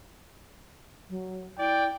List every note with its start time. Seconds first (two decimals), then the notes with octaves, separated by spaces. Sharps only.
1.09 F#3
1.59 E4 D5 G5